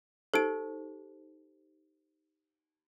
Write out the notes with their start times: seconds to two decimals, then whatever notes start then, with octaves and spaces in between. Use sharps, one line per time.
0.34 D#4 G4 A4 C5 D7